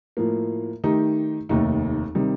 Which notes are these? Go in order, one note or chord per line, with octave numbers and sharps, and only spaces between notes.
A2 F3 A#3
D#3 A3 D#4 G4
F1 D#2 D#3 A3 D#4
C3 D#3 G3